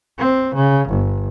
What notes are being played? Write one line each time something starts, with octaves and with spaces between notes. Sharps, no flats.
C4
C#3
G1